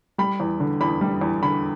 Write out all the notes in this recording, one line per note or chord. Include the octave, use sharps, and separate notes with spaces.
G3 B5
E2
D3
E2 B5
G3
E2
D3 B5